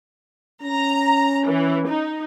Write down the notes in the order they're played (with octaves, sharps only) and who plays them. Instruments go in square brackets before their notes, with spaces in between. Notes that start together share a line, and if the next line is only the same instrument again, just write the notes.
[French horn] C#4 [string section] A#5
[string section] E3
D#4